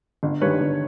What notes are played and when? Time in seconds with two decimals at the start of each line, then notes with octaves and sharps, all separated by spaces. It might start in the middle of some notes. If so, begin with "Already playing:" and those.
0.23 G1
0.41 G2 D#3 G3 B4 C#5
0.61 G1